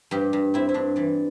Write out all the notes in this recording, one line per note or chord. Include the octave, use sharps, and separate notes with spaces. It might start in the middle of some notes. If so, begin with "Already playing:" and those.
G2 G4
G2
C4 E4
E4
G2 D4
E3 D5